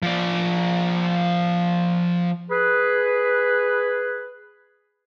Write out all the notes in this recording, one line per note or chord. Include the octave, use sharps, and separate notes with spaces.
F3 D5
G#4 B4